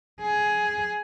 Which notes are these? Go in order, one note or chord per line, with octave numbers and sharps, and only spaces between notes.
G#4